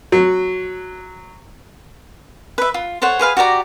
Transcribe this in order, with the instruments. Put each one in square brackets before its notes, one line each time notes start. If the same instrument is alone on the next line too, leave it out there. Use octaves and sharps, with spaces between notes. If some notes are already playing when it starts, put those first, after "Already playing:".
[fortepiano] F#3
[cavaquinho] B4 E5
F4
A4 C5 C#5 F#5
G#4 B4 F5 G#5
F#4 G4 D5 A#5